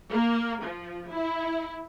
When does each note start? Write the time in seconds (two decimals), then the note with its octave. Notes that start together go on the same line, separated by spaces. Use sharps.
0.11 A#3
0.63 F3
1.10 E4